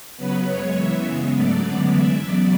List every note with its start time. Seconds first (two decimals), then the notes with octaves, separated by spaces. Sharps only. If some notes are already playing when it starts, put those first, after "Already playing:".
0.17 C#3 F#3 B3 B4
0.46 F#2 C#3 G#3 C#5
0.75 F#2 C#3 E3 B3 E5
1.05 C#3 G#3 B3
1.34 G#2 F#3 A3 D5
1.64 F#2 D3 G#3 B3
1.92 F#2 E3 G#3 B3 E5
2.22 E2 C#3 F#3 B3 D5